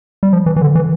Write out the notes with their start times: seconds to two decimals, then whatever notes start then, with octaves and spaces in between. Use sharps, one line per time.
0.23 G3
0.33 F3
0.46 E3
0.56 E3
0.62 D3
0.75 E3